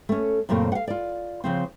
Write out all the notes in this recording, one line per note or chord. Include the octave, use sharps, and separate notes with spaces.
A3 C#4
F#2 A#2 C#3 A3 C4
F5 F#5
F4 D5
C#3 F3 C4